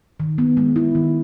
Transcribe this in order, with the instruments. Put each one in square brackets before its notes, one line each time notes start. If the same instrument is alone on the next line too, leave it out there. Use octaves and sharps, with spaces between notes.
[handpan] D#3
B3
G#3
E4
D#3